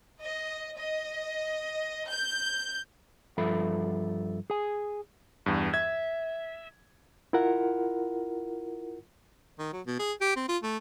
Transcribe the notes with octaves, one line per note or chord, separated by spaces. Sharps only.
D#5
D#5
G6
G2 F3 A4 E5 B5
G#4 G#5
E2 G2
E5 G#6
E4 F4 A#4 F#5
D#3
F#3
B2
G#4
G4
C4
F4
A3